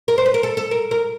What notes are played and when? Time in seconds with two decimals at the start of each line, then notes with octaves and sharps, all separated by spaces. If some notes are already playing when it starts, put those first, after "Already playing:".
0.08 A#4
0.18 C5
0.26 B4
0.34 A#4
0.43 A4
0.57 A4
0.71 A#4
0.91 A#4